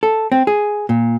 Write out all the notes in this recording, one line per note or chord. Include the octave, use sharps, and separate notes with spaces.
A4
C4
G#4
A#2